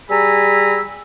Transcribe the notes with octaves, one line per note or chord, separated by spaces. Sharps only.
G3 G#4 G#5 A#5 B5 E6